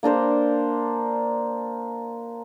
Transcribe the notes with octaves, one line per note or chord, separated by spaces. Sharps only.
A#3 D4 A#4 C5